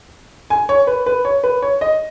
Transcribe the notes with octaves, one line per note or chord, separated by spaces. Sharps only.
G#5
C#5
B4
B4
C#5
B4
C#5
D#5